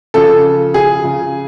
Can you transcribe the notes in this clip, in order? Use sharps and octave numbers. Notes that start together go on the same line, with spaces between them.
C#3 F3 A4
G#4
C#3 F3